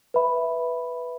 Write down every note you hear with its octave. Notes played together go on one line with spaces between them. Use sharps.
B4 E5 B5